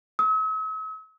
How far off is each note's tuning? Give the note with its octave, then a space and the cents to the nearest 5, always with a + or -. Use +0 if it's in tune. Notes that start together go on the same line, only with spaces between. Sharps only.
E6 -45